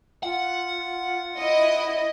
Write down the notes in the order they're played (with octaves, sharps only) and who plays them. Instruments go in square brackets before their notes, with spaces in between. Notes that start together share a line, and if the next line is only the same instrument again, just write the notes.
[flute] F4 [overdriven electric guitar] F#5
[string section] E4 D#5